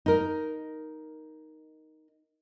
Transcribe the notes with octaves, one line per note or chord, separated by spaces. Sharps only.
D#4 A#4